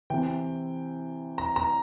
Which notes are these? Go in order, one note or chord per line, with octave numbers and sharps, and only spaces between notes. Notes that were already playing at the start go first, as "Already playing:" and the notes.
C3 E3 G5
A#5
A#5